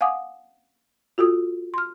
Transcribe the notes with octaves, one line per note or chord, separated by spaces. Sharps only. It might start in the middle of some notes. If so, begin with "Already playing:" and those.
F5 F#5 G#5 D6 D#6
F4 F#4 A4 D#6
C6 F6